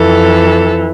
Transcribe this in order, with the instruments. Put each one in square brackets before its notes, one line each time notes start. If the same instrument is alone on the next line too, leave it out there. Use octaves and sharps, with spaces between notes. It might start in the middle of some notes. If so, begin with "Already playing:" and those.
Already playing: [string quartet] F2 E3 A4